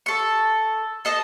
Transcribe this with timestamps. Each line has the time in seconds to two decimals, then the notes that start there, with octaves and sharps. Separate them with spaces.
0.06 A4 C#6
1.05 A4 D#5 A5